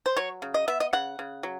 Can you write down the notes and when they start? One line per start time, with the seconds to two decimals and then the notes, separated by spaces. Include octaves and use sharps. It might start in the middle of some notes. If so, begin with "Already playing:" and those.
0.06 C5
0.17 F#3 C#5
0.42 C#3
0.54 D#5
0.68 B3 E5
0.80 D#5
0.93 C#3 F#5
1.19 C#3
1.43 F#3